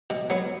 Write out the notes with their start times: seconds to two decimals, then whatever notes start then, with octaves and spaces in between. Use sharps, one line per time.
0.10 B2
0.30 F#3 B3